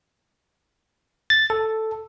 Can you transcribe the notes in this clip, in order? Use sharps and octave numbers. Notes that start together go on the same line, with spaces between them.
A6
A4